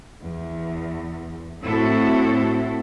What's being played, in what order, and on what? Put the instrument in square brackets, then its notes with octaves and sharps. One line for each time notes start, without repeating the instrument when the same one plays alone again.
[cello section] E2
A2 C4 E4 F#4 A4